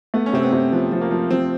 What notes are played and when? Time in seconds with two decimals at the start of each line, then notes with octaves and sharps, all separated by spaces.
0.14 A3 B3
0.26 C#4
0.33 C3 C4
0.43 B3
0.53 C3
0.72 F3 B3
0.92 F3
1.01 A#3
1.11 F3
1.31 F3 C4